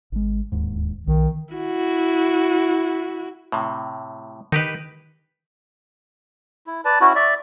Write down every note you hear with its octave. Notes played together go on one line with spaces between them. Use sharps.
G#1 G#3
D1 D#2 G#2
B1 D#3
E4 F#4
A2 C3
D#3 D#4 G4 B4
E4
B4 D5 A5
C#4 E4 F#4
D5 E5